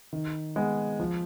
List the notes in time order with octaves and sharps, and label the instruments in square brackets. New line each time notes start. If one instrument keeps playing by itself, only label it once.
[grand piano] D#3
G#3 B3
F3